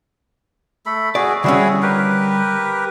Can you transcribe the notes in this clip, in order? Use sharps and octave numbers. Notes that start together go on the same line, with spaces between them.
A3 A4 B5
F#4 G#4 D5
D3 G3 C#4 E4 F#4 G#4
G4 A#4 B4